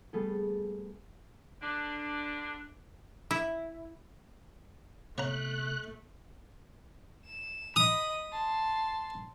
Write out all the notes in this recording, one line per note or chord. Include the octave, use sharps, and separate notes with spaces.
G3 A3 B3 G#4 A4
D3 D4
E4
C3 A3 B3 C#5 A#5 F#6
E7
D#5 B5 D#6
A5 C6